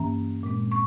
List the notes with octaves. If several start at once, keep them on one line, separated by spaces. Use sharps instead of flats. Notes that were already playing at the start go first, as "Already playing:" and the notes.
Already playing: G2 E3 A#3 C#4 A#5
A#2 G#3 C4
C#6